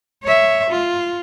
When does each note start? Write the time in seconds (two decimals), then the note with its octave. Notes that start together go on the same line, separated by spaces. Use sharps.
0.23 C#5 E5
0.70 F4